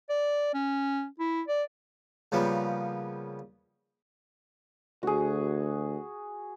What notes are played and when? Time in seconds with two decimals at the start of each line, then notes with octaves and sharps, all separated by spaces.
0.10 D5
0.54 C#4
1.19 E4
1.48 D5
2.32 C#3 F3 G3 A#3 B3
5.03 D2 F#4 G#4